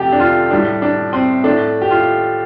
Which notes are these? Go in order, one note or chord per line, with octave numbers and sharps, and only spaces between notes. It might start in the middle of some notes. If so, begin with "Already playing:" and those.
Already playing: F2 C3 A3 G4 A4
D4
F4
A2 G3 D4
D4
C4
A2 A3 D4
G4
F4